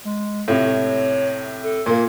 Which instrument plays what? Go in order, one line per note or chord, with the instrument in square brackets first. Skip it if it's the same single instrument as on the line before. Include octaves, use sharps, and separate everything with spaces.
[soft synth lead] G#3
[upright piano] A2 C3 A3 [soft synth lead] C#5
[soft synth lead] A4
[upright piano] A#2 A#3 [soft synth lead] G#6